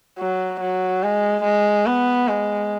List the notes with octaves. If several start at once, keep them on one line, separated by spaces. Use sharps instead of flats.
F#3
F#3
G#3
G#3
B3
G#3